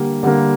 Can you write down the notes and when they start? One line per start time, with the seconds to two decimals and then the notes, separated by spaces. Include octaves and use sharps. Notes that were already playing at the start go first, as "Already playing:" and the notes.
Already playing: D3 G3 A#3
0.23 D3 G3 A#3